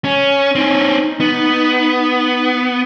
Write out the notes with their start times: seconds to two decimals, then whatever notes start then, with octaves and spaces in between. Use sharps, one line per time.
0.05 C#4
0.55 C4 C#4 D#4
1.20 B3